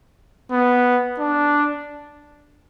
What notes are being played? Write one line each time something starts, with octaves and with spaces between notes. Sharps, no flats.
B3
D4